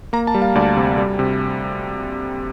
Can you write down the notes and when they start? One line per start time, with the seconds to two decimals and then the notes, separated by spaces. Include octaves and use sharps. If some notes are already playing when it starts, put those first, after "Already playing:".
0.13 A#3 A#5
0.27 A5
0.34 G3
0.42 F5
0.55 D2 D5
0.77 C3
0.98 G3
1.19 C3